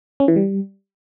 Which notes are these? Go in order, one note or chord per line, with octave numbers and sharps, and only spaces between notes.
C#4
E3
G3